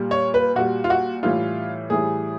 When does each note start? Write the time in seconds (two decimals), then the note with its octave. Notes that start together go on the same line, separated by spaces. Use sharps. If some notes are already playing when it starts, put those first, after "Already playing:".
Already playing: A#2 G3
0.11 C#5
0.34 B4
0.55 A#2 G3 F#4
0.84 F4
0.90 F#4
1.23 A2 E3 G3 F4
1.90 A2 E3 G3 G#4